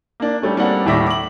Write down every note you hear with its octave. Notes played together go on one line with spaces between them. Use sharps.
A#3 D4
G3 A3 C#4
G3 A#3 C4 D4 F#5
D#2 A2 G3 E5 D6 A#6
D6 F#7